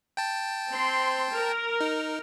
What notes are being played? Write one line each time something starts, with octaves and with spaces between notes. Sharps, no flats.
G5 A5
C4 C6
A#4
D#4